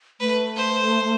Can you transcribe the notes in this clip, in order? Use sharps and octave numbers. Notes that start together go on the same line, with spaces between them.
A3 B4
C5